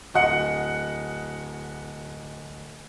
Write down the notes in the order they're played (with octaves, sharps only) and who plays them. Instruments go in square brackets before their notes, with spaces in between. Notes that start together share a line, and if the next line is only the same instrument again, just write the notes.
[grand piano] D1 D#5 F#5 F#6 C#7